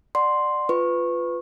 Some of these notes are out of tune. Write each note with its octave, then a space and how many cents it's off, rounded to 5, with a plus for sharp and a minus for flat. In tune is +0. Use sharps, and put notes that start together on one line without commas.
D5 +20 F#5 +0 C6 +0
F4 +0 B4 +15 C#6 -20